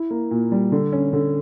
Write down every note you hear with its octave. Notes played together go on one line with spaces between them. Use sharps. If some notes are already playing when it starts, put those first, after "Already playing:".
Already playing: E4
A#3
A#2
G3
D3
C#4
D3